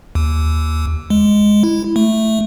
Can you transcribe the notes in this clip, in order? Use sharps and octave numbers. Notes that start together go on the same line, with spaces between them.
D#2
G#3
E4
A3